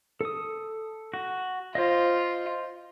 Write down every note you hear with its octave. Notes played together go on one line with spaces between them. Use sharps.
A4 D#6
F#4
F4 C5 D#5